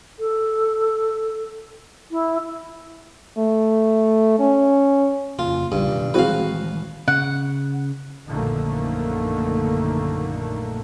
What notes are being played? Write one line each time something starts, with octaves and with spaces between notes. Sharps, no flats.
A4
E4
A3
C#4
F2 C#3 A#3 F4
A1 G2 C#3
B2 D#3
D#3 E3 G#3 C4 F#4 G#4 B4 F5
C#3 F#5
A#1 F#2 D3 D#3 A3 A#3